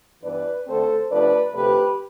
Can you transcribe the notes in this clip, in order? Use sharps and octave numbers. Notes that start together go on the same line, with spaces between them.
G2 E3 B3 D4 B4 D5
D2 D3 A3 C4 A4 C5
C3 F3 A3 D4 B4 D5
D2 C3 F3 A3 G4 B4